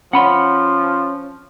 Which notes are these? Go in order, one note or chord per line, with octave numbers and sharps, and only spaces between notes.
F3 C#4 C#5 F#5 B5 C6